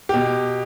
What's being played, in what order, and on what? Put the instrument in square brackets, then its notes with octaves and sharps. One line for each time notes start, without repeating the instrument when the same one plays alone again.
[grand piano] B2 G4